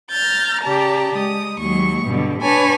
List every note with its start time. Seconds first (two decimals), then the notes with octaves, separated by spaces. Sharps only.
0.11 A#5 F6 G6 A6
0.62 C#3 G4 D5 A5 A#5
1.15 G#3 D#6
1.59 D#2 F#3 G#3 C#6
2.06 G2 B2 D3
2.41 D4 B4 C#5 G#5 A5